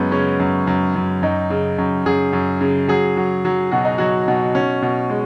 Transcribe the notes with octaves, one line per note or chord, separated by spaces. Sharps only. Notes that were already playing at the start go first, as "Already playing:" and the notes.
Already playing: F#2 G#3 B3
C#3 C#4
F#2
F#2
F#2
F#2 D#4
C#3
F#2
F#2 G#4
F#2
C#3
F#3 G#4
F#3
F#3
B2 F#4
D#4
F#3 F#4
B2
B2 C#4
B2
G#3